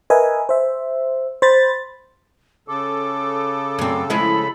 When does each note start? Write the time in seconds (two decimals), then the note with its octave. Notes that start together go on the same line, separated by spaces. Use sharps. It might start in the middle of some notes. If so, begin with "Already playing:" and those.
0.10 A#4 B4 D#5 E5 G#5
0.49 C5 E5
1.42 C5 B5 A6
2.68 C#3 A4 D6
3.79 F#2 C4
4.10 F3 G#3 E4 B5